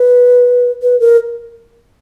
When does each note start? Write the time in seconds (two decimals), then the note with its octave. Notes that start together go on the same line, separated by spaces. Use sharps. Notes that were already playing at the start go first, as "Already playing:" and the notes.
Already playing: B4
0.82 B4
1.00 A#4